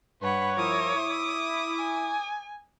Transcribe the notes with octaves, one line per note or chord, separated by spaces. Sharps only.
G2 B4 C#5 F#5 B5
F3 E4 A#4 D6 D#6
E4
G#5